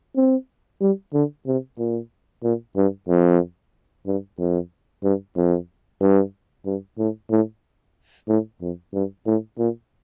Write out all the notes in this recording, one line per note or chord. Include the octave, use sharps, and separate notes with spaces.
C4
G3
D3
C3
A#2
A#2
G2
F2
G2
F2
G2
F2
G2
G2
A2
A2
A2
F2
G2
A2
A#2